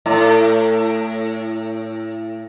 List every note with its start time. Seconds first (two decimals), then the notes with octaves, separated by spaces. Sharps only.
0.06 A2